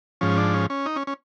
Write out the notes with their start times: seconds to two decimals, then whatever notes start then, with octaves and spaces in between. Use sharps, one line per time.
0.21 G#2 F3 C#4
0.37 D4
0.54 C#4
0.70 C#4
0.86 D#4
0.96 C#4
1.07 C#4